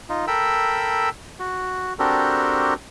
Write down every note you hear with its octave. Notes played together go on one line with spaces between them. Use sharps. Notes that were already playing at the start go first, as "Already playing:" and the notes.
D#4 F4
A4 A#4 G5 B5 E6
F#4
C4 D4 F#4 G4 A4 A#4